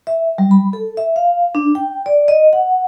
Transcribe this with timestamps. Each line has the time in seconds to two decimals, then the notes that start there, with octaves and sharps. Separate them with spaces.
0.07 E5
0.38 G3
0.51 B5
0.73 A4
0.97 E5
1.16 F5
1.55 D4
1.75 G5
2.06 D5
2.28 D#5
2.53 F#5